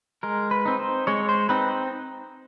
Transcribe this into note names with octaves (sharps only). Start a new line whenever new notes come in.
G#3 A#4
B4
C4 D#4
C5
G#3 C#5
C5
C4 D#4 B4